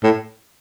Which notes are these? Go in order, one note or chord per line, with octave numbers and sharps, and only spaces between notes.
A2